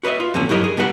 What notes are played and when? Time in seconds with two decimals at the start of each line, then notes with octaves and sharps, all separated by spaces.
0.03 F#4 B4 C#5 D#5 E5
0.20 F4
0.34 F2 A#2 D3 C#4
0.49 G2 F#3 E4 A#4 D#5 B5
0.64 G#4
0.77 B2 G3 G4 B4 F#5 A#5